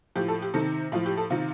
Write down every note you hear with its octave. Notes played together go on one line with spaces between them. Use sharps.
A2 F3 G4
A4
G4
C3 D#3 A4
A2 F3 F4
G4
A4
C3 D#3 F4